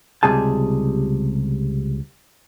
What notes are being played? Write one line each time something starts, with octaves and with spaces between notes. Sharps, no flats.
C#2 C3 G3 G#4 A5